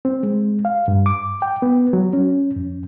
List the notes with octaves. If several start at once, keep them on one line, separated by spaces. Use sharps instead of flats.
C4
G#3
F5
G2
D6
G5
B3
F#3
C#4
F2